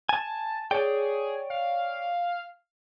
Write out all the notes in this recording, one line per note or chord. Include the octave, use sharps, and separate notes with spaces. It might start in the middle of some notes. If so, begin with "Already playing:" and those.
G#5 A5
G#4 C#5 D5 G5
F5